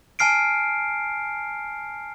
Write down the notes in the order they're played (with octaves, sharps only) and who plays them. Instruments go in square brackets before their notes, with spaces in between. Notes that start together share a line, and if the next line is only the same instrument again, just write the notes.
[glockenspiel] G#5 A5 F6 C7 D7